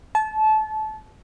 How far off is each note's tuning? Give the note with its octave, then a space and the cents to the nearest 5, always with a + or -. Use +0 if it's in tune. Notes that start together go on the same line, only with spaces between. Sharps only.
A5 -25